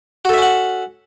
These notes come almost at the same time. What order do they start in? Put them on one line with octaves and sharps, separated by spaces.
F#4 A4 E5 C#4 F#5